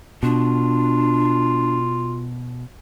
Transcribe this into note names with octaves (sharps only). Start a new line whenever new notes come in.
B2 D4 F4